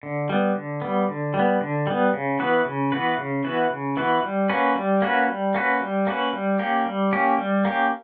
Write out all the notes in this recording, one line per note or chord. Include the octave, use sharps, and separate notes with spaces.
D3
G3 B3
D3
G3 B3
D3
G3
B3
D3
G3 B3
C#3
E3 B3 F#4 B4
C#3
E3 B3 F#4 B4
C#3
E3 B3 F#4 B4
C#3
E3 B3 F#4 B4
G3
A#3 C#4 F#4 B4
G3
A#3 C#4 F#4 B4
G3
A#3 C#4 F#4 B4
G3
A#3 C#4 F#4 B4
G3
A#3 C#4 G4
G3
A#3 C#4 G4
G3
A#3 C#4 G4